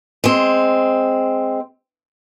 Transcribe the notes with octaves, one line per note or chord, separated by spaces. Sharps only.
G#3 C4